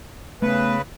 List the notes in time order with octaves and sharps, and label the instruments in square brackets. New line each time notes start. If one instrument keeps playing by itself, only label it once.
[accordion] C#3 B4 [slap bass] A3 B3